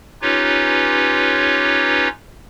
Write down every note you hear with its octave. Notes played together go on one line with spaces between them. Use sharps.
C#4 D#4 F4 G4 B4 C#5